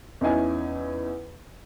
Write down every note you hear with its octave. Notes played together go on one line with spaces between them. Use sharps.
E2 C#4 D#4 E4 G#5